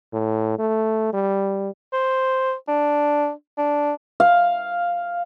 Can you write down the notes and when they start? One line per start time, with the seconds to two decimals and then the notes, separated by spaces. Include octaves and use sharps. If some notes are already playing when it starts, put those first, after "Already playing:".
0.13 A2
0.59 A3
1.13 G3
1.93 C5
2.68 D4
3.57 D4
4.20 F5